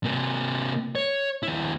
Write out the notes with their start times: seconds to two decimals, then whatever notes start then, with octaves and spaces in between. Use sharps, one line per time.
0.04 C3 A#3
0.95 C#5
1.43 D#2 E4